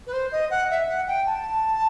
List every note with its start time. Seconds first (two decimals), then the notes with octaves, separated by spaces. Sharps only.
0.07 B4
0.13 C5
0.32 D#5
0.51 F#5
0.70 E5
0.88 F#5
1.07 G5
1.26 A5